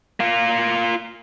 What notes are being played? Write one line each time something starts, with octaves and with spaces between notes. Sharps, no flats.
A#3 F4